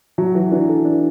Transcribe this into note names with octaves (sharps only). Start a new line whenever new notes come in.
F#3 F#4
E3 F#4
E3 D4
A4
D4